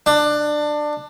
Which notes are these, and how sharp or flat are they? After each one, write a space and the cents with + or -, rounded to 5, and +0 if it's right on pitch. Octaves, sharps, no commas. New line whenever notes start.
D4 +20